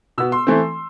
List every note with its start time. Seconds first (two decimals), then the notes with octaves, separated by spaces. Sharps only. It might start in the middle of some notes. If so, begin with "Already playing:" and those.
0.18 B2 B3 E6
0.32 C6
0.47 E3 A3 C4